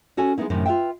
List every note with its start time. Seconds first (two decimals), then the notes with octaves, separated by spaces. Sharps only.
0.17 C#4 F#4 A4 C#5 G#5
0.38 G#3 A#3 B3 D#4 E4
0.50 F#2 A2 C3 D#3
0.66 F4 A4 B4 E5 G5